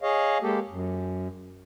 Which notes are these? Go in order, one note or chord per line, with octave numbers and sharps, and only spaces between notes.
G#4 C#5 D#5 F5
G#3 A#3 G4 A4
F#2